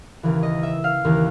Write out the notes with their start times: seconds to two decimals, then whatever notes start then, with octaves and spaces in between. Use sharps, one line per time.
0.23 D#2 C#3 E3
0.43 D#5
0.63 E5
0.84 F5
1.04 D#2 C#3 E3